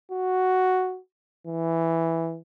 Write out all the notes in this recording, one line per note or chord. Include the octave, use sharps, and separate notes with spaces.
F#4
E3